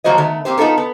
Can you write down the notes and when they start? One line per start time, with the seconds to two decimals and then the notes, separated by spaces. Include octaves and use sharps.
0.04 F3 F#3 A#3 F#4 C5 D#5
0.18 D#3 A3 B3
0.45 A#3 C4 G4 C5
0.58 B3 D#4 F4 A4 A#4
0.78 B3